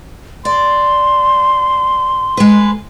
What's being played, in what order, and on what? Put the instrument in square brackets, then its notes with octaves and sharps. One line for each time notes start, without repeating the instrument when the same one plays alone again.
[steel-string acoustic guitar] D5 [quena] C6
[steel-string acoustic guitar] G#3 B4